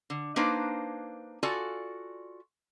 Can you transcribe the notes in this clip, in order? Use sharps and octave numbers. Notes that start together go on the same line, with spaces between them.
D3
A#3 D4 D#4 B4 C5
F4 F#4 A4 D5 G#5